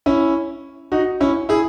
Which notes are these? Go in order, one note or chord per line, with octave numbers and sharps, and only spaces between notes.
C#4 E4
D#4 F#4
C#4 E4
E4 G#4